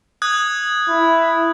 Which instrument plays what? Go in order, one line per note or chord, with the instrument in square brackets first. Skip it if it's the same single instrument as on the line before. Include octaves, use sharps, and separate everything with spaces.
[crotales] D#6 F#6 G#6
[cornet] E4